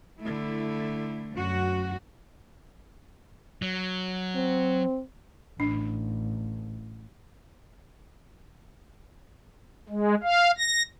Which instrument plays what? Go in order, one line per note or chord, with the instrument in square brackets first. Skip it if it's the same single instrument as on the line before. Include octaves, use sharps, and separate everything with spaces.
[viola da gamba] D3 A3 [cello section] E4
[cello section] F#2 F#4
[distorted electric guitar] F#3
[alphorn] C4
[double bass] A1 [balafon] D4
[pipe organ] G#3
F5
A#6